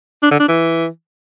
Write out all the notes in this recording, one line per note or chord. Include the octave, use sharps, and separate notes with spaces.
D4
D3
D4
E3